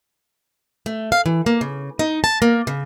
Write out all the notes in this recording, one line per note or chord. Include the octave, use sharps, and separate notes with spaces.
A3
F5
E3
A#3
C#3
D#4
A5
A#3
C#3